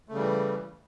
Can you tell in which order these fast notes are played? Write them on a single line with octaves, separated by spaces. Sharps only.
A3 C#3 G3 E3